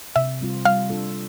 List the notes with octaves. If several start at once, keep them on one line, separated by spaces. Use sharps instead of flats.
C3 E5
G3 C4 F4
G3 F5
D4 F4 A4